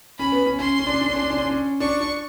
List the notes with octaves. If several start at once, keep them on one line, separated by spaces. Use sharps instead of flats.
C#4 B5
B3
C#4
C#4 C6
C#4
D4
C#4
D4
C#4
D4
C#4
D4
C#4
D4
C#4
D4 C#6
D4